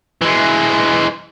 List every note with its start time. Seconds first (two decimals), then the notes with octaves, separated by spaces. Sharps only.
0.21 E3 G#3